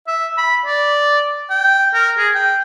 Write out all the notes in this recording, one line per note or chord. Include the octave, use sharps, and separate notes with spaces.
E5
B5
D5
G5
A#4
G#4
G5